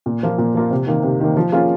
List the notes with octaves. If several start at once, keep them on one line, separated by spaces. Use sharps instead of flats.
A#2
F3 A#3 F4
A#2
F3 A#3 F4
C3
D#3 A#3
C3
D#3 A#3
F3
A#3 C#4 F4 G#4